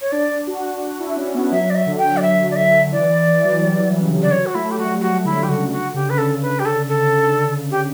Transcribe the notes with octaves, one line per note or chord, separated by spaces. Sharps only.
C#5
D4 D5
F#4
F#4
E4
C#4
B3
F#3 E5
D5
E5
D3
G5
D5
E5
D5
E5
D3
E3 D5
E3
F#3
G3
F#3
E3
C#3
D3
G3 D5
F#3 C#5
F#4
A3 E4
A3 G4
G3 F#4
G3
F#3 F#4
D3 E4
G4
C#3 F#4
D3 F#4
C#3 G4
D3 B4
C#3 A4
B4
G4
A4
A4
G4